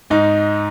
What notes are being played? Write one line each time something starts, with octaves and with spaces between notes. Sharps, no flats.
G#2 D#4